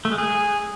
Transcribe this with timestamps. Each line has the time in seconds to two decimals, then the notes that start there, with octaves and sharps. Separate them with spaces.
0.05 A3
0.12 G#3
0.18 G#4